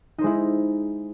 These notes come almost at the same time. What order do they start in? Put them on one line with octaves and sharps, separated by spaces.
D#4 C5 G#3 E4